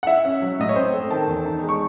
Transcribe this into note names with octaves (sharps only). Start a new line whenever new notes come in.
F#5
E4 E5
C#4
F#3
A2 D#5
C#5
C4 C5
A3
D#3 A5
E2
D#4
G#3
C#6